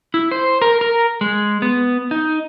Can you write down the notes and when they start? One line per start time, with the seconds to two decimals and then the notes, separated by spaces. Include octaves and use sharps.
0.14 E4
0.31 C5
0.62 A#4
0.81 A#4
1.21 G#3
1.62 B3
2.11 D#4